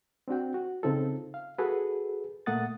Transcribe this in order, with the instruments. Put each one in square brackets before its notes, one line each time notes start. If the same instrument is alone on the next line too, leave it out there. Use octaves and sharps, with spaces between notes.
[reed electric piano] C4 D4 F#4 G5
F#4
C#3 C4 D#4 F4 A4
F5
F#4 G#4 A4 B4
A#2 A3 A#3 F#5 D#6 A6